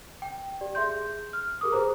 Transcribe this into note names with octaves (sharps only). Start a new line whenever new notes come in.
G5
G4 D5
G#4 E5 C6 G6
F6
G4 G#4 A#4 D6 D#6
G#4 B4 C5 A#5